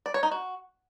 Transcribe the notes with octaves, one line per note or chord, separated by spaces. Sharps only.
D5
C#5
D#4
F#4